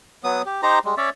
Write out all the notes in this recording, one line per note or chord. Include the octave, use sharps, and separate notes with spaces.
F#3 B3 D#6
G4
D#4 G4 C5 A#5
G3 G#3
C#4 C#5 D5 E5